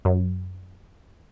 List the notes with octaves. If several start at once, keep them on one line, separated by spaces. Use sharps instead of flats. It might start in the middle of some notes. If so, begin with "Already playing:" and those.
F#2